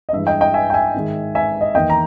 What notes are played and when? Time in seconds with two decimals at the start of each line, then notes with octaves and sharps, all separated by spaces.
0.09 D#5
0.13 G2 E3 G#3 E5
0.27 D#5 G5
0.41 D#5 G5
0.54 E5 G#5
0.70 G5
0.74 E5 G#5
0.94 G#2 D#3 G#3
1.35 E5 G#5
1.61 D#5
1.75 E2 D#3 A#3 D#5 G5
1.90 A#5